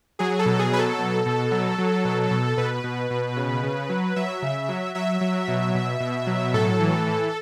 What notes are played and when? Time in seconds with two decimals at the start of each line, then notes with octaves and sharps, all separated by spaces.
0.19 F#3 G#4
0.39 A4
0.46 B2
0.59 G#4
0.72 F#3 B4
0.79 A4
0.98 B2
1.26 B2
1.51 F#3
1.78 F#3
2.05 B2
2.31 B2
2.57 B2 B4
2.84 B2
3.10 B2
3.37 C#3
3.63 C#3
3.89 F#3
4.16 F#3 E5
4.42 C#3
4.69 F#3
4.95 F#3 E5
5.21 F#3
5.48 B2
5.75 B2
6.00 B2
6.27 F#3
6.53 A2 A4
6.80 E3
7.07 E3